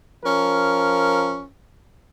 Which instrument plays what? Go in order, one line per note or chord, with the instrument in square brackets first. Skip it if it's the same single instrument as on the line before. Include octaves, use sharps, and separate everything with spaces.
[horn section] F3 C#4 A#4